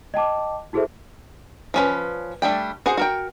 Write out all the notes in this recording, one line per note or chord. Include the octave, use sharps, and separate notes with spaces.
D#5 G5 A5 D6
E4 F#4 G#4 A4 C5 E5
F3 C#4 B4
G3 A3 D4 G5
F#4 G#4 C5 F#5
F#4 A#4 G5